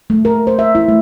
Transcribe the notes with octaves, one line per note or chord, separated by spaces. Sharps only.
A3
A#4
C5
E5
E4
A3